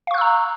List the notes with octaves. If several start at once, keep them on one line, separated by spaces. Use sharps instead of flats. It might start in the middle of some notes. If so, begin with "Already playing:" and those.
F5 A#5 C#6 E6 F#6